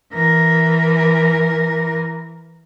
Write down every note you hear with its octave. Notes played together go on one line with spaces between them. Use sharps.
E3 A#4